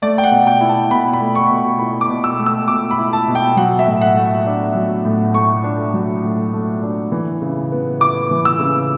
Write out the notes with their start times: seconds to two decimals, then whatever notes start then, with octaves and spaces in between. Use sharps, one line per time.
0.02 A3 D5
0.18 G5
0.24 F#5
0.31 B2
0.47 G5
0.61 E4
0.69 A5
0.91 B2 B5
1.13 B5
1.20 A3
1.35 C#6
1.50 B2
1.57 C#6
1.79 E4 B5
2.01 D6
2.09 B2
2.24 E6
2.39 A3
2.46 E6
2.68 B2 D6
2.91 B5
2.98 E4
3.13 A5
3.28 B2
3.35 G5
3.57 F#3 F#5
3.79 E5
3.87 A2
4.01 F#5
4.16 A3
4.46 D4
4.75 F#3
5.05 A2
5.34 A3 C#6
5.64 D4
5.94 F#3
6.23 A2
6.53 A3
6.83 D4
7.12 E3
7.41 C#3
7.72 B3
8.00 E4 D6
8.31 E3
8.45 E6
8.60 C#3